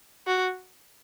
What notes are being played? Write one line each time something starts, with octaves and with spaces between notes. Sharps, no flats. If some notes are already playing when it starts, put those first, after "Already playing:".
F#4